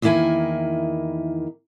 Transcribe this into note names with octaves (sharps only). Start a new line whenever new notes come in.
E2 D#3 A#3 E4 G#5